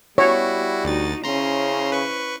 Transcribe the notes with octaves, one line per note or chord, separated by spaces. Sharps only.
G3 B3 E4 F#4 C#5
D2 D#4 F#4 A6
C#3 C#4 E4 C5 A#5 C6
B4 C#6